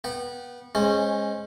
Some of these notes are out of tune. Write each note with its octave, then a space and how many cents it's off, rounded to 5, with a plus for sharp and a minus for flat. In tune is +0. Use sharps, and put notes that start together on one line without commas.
B3 -25 G5 -35
G#3 +0 C#4 -20 C5 +0